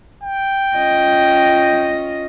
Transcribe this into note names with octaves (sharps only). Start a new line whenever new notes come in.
G5
C#4 F4 D#5